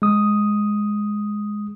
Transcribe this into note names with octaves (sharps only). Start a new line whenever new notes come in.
G#3 D#6